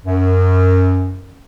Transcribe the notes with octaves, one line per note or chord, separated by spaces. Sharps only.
F#2